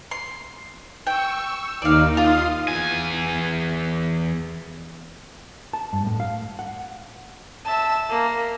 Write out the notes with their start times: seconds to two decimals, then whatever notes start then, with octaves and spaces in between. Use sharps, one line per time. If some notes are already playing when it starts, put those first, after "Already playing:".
0.11 C6
1.07 G5 C#6 E6
1.47 E6
1.82 D#2 D#4 D5 F5
2.17 F4 F5 C6 D#6
2.68 E2 G#5
5.73 A5
5.93 G2
6.07 A2
6.20 F5
6.59 F#5
7.65 E5 A5
8.09 A#3